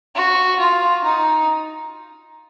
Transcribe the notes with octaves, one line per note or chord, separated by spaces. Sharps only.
F#4
F4
D#4